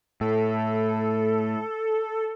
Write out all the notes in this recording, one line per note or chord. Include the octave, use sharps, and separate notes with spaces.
A2 A4